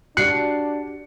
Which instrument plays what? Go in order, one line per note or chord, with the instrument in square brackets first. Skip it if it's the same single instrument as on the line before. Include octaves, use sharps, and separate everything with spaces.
[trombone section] D4 [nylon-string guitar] F#4 G4 D5 [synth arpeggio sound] F#6 C7 [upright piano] C#7